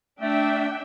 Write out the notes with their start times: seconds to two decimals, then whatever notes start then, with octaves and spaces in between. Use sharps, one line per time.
0.21 A3 D4 E5 G5